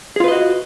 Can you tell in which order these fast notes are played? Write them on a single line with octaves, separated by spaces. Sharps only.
G#4 F4 B4 D#5 F#4